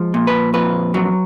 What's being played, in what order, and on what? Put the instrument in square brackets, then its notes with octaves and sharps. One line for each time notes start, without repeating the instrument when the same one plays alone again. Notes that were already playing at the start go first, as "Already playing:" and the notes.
Already playing: [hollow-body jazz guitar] F3 G#3
A#2
B4
F2 B4
F#3